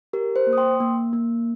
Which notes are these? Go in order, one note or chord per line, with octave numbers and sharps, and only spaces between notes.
G4 A#4
C5
A#3
D#6
G5 C6
A#3
A#3